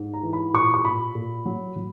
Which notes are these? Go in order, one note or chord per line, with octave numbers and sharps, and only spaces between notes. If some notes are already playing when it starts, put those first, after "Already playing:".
Already playing: G#2
A#5
E3
B5
A#2 C#6
C#6
A#2 B5
A#2
F#3
F#3